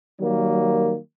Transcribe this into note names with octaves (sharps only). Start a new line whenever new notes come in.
D#3 F#3 G3 A#3